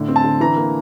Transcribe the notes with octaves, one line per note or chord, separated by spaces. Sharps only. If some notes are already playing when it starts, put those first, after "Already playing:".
Already playing: A2 D3
C4
A5
D3
E3 A#5
A#3